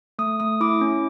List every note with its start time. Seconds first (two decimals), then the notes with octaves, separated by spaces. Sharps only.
0.19 A3 D#6
0.40 A3 D#6
0.60 E4 D6
0.81 C#4